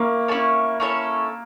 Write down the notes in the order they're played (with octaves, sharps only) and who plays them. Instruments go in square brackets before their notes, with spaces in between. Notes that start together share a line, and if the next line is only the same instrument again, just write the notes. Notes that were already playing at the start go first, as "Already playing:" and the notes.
Already playing: [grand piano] A#3 [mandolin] C#4 E4
[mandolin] A4 C#5
C#4 E4
C#4 E4 A4 C#5